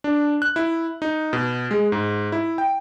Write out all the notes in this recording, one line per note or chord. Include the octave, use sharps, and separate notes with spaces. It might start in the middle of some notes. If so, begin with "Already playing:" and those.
D4
F#6
E4
D#4
B2
G#3
G#2
E4
G5